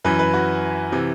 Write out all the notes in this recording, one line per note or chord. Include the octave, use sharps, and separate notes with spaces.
F#2 E3 B4
B4
F#4
C3 E3